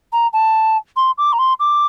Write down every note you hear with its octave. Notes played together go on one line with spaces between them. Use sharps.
A#5
A5
C6
D6
A#5
C6
D6